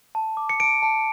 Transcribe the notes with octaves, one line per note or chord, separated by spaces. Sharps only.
A5
D6
C#7
A5 D7
A5